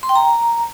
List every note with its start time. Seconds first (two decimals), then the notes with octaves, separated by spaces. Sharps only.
0.03 C6
0.09 G5
0.15 A#5